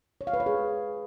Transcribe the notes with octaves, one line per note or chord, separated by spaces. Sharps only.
C#5
F5
B4
C#5
G#4